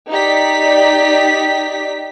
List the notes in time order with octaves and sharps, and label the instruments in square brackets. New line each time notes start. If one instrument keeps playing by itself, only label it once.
[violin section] D#4 G4 D5 B6